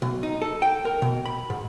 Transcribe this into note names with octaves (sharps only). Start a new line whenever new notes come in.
B1
D#4
A4
G5
A#4
B2
B5
G#2